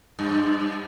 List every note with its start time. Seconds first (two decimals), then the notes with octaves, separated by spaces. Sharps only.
0.19 G2